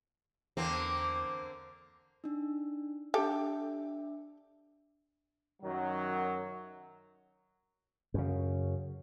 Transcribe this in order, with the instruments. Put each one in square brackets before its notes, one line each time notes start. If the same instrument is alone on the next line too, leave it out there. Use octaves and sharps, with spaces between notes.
[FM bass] E2 [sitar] D3 A#3 C4
[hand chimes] D4 D#4
[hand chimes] D4 E5 [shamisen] G4 A4
[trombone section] F#2 D#3 F#3
[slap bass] F#2 C#3